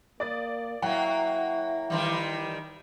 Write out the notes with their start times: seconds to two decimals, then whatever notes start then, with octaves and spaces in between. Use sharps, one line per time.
0.20 A#3 D5 D#6 A6
0.82 F#3 A#3 E4 F#5 G5
1.90 D#3 E3 G3